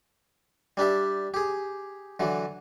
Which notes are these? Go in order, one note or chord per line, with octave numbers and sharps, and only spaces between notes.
G3 D4 G4 E5
G4 G#4
D3 E3 F#3